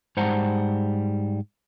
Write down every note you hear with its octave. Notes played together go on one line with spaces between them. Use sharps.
G#2 G3 C5 F#5 A5 A#5